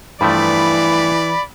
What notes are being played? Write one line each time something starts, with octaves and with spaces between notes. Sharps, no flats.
G2 E3 F3 A3 D5 B5